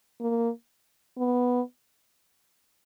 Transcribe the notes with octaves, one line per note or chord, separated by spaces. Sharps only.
A#3
B3